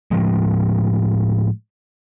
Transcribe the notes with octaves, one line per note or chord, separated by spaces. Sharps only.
A2 F3 G#3